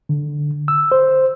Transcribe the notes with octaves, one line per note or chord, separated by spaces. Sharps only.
D3
E6
C5